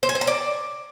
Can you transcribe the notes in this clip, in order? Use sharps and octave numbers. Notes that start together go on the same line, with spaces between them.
C5
G#5
C5
A#5
D5